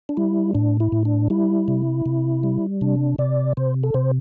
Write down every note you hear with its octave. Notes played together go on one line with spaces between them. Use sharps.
D4
G3 E4
A2 D4
E4
A2
D4
G3 E4
C3
C3
G3
C3 D4
C3 D5
C3 C5
A4
C3 C5